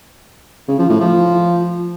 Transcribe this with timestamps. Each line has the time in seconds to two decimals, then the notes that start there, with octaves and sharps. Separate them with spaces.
0.68 C#3
0.79 F3
0.90 A2
1.00 F3